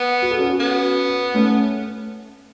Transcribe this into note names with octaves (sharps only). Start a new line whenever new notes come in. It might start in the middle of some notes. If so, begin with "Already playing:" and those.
Already playing: B3
F#4
A4
C#4 F#4
B3
A3 C#4